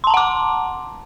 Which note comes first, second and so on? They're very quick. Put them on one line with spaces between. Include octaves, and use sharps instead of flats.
C6 A5 A#5 F#5 D6